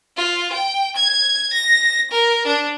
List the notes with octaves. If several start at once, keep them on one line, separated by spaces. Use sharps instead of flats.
F4
G5
G#6
A#6
A#4
D4